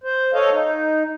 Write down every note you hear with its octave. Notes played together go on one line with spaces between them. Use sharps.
C5
A4 C#5 D#5 F5
D#4